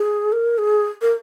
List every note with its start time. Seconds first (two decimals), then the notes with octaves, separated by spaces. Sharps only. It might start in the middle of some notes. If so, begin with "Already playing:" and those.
Already playing: G#4
0.32 A#4
0.58 G#4
1.02 A#4